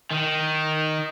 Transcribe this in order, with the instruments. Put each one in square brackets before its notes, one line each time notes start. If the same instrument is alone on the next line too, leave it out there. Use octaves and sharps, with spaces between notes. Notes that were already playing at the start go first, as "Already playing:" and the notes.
[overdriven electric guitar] D#3